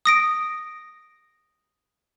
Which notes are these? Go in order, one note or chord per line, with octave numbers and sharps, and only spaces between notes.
D#6 A#6 D7